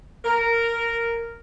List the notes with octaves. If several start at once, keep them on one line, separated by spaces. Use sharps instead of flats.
A#4